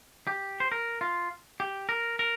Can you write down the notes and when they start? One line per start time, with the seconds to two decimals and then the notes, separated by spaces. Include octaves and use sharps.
0.27 G4
0.60 C5
0.72 A#4
1.01 F4
1.60 G4
1.89 A#4
2.19 A#4